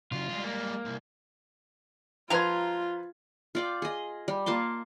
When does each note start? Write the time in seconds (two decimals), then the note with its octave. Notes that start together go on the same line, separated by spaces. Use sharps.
0.12 C#3 F#3 F4
0.29 G3 G#3
0.44 A#3
0.85 C2
2.30 F3 F4 B4 A#5 C6 G#6
3.55 F4 D5 G5
3.82 G#4 D#5
4.28 G3
4.46 A#3 F4 A5 C6